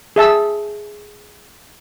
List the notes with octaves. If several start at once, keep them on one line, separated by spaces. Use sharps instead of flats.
G#4 E5 A5 E6